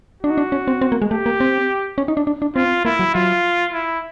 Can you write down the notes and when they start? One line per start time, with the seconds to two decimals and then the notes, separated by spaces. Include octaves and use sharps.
0.23 D4 F#4
0.30 D#4
0.38 D4
0.52 C#4
0.68 C4
0.81 C4
0.92 A#3
1.02 G#3
1.10 A3 G4
1.26 A#3
1.40 C4
1.98 C#4
2.08 D#4
2.17 D4
2.27 D4
2.42 D4
2.56 C4 F4
2.85 A#3 E4
2.99 F#3
3.14 F#3 F4
3.73 E4